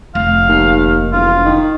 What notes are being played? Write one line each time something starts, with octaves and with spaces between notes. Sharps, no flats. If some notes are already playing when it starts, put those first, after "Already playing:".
F1 F5
D#2
E1 F4
D#3